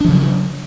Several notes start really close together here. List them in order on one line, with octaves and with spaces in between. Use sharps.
D4 F3 C#3 F#3